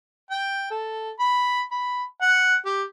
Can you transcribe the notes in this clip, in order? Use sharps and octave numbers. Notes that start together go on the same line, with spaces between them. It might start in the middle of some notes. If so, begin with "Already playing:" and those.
G5
A4
B5
B5
F#5
G4